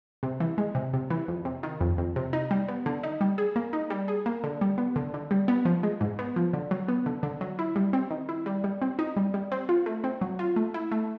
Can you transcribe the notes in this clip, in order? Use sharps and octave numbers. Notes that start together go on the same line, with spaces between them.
C3
E3
G#3
C3
C3
E3
F2
C3
D#3
F2
F2
C3
D#4
G3
B3
D3
D#4
G3
G#4
A#3
D#4
G3
G#4
A#3
D3
G3
B3
D3
D3
G3
B3
F3
G#3
G#2
B3
F3
D3
F#3
B3
D3
D3
F#3
E4
G3
C4
D#3
E4
G3
G3
C4
D#4
G3
G3
C4
F4
A3
C4
F#3
F4
A3
E4
A3